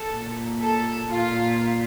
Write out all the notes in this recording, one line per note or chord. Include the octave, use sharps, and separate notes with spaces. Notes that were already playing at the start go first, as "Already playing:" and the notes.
Already playing: A4
A#2
A4
A#2 F4